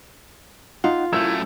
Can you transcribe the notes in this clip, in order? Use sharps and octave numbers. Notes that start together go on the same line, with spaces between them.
D#4 F4 F#5
F#2 A3 E4 E6 G6 G#6 E7